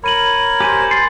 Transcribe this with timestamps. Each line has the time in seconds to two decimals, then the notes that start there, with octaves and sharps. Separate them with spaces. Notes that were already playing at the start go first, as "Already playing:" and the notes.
0.04 A#4 C#5 B5 D#7 F#7
0.60 G4 C5 G#5 D#7
0.91 C6 A6